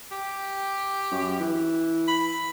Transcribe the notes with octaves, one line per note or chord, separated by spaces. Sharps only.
G4
F#2
E3
B5